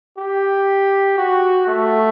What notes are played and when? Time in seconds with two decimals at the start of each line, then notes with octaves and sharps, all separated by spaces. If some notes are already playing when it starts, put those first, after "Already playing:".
0.18 G4
1.18 F#4
1.67 A3